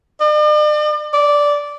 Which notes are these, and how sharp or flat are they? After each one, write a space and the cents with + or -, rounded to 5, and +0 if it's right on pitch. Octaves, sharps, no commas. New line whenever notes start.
D5 +45
D5 -10